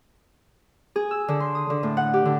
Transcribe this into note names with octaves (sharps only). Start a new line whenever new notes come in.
G#4
E6
D3
C6
D#6
D3
A2
F#5
G4
D3